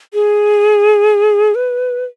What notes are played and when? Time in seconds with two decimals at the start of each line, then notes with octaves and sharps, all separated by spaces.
0.14 G#4
1.55 B4